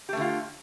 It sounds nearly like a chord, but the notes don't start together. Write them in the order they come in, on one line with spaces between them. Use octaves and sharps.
G4 A3 D3 F4